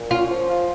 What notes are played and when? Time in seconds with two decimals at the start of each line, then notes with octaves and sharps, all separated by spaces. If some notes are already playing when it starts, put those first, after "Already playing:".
Already playing: A#2
0.11 C#4 F4
0.29 F3
0.48 F4